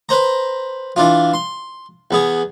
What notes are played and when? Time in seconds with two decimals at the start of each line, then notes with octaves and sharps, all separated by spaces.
0.09 B4 C5 A#5
0.96 E3 D4 F4
1.34 C6
2.11 E2 B3 G#4